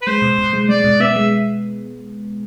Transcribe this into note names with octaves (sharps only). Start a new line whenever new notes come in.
B4
G#3 C5
B2
B2
G#3
G#3 D5
B2
B3 E5
G#3